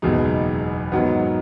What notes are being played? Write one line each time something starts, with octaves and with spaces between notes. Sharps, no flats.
F#1 E2 B2 G#3 D#4
G#2 D#3 F#3 B3